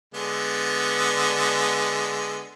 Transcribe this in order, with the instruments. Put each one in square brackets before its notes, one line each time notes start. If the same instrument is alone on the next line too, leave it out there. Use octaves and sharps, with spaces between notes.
[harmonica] D3 G#3 B3